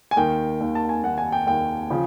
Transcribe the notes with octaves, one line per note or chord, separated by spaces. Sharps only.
G#5
D#2 D#3 G5
D#2 D#3
A5
G#5
D#2 D#3 F#5
G#5
G5
D#2 D#3 G5
C#3 F3